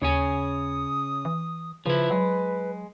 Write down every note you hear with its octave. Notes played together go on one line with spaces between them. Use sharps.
D#2 C#3 C#5 G#5 D#6
E3
C#3 F3 E4 B4
F#3 G#3